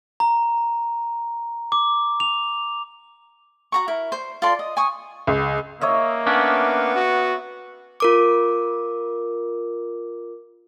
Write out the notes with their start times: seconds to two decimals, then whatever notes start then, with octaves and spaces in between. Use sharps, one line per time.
0.20 A#5
1.72 D6
2.20 F7
3.72 F#4 A#5 C#6
3.88 E4 A#4
4.12 C5
4.42 F4 A4 D5 C6
4.59 D#5
4.77 G#5 C#6 D#6
5.27 C#2
5.81 A#3 C#5 D#5 E5
6.27 B3 C#4 D4
6.95 F#4
8.00 F4 A#4 D6